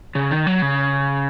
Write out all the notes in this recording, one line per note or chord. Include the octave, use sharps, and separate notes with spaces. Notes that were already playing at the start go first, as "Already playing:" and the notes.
C#3
D#3
F#3
C#3